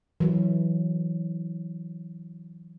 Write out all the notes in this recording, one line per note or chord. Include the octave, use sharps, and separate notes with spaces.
E3 F#3